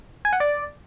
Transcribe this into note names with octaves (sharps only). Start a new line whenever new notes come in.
G#5
F#5
D5